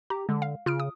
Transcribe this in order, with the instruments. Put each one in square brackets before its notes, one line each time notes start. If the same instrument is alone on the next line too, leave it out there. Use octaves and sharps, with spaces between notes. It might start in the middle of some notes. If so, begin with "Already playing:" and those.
[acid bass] G4 [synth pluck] A#5
[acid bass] D3 [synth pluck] G#3
[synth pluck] F5
[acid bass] C#3 [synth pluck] F4 F6 D7
[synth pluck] D#6